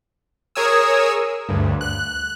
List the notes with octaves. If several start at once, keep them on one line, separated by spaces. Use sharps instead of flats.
G#4 A#4 C#5 G#5 D#6 E6
D2 G2
F#6